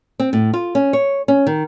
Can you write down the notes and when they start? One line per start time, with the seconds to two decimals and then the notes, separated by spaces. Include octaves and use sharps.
0.20 C4
0.33 A2
0.54 F4
0.75 C#4
0.93 C#5
1.28 C#4
1.47 D#3